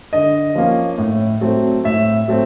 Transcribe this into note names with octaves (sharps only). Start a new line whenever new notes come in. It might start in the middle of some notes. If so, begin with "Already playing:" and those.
D3 D#5
F3 A#3 C#4
A2
F#3 A3 C4
A2 E5
F#3 A3 C4